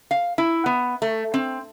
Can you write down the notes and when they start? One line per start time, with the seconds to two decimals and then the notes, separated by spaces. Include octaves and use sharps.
0.11 F5
0.38 E4
0.66 B3
1.02 A3
1.34 C4